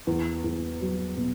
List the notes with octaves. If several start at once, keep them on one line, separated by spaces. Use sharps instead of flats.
E2
E2
F#3
B2